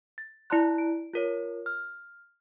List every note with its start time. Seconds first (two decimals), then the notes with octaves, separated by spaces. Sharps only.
0.18 A6
0.50 E4 D5 A5 A#5 C6 F#6
0.78 D7
1.14 F4 A#4 C#5
1.66 F6